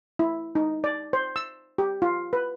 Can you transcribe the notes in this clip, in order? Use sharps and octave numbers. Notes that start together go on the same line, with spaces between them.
E4
D#4
D5
C5
E6
G4
F4
B4